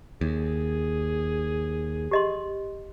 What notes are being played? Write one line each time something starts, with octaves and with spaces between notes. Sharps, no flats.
D#2 G#4
G4 D#5 C6